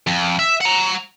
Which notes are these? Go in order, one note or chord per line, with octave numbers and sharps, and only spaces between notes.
F2
E5
F#5 A#5